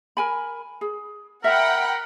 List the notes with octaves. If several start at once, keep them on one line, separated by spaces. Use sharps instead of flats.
A#4 G#5 B5
G#4
A#4 E5 F#5 G5 A#5 B5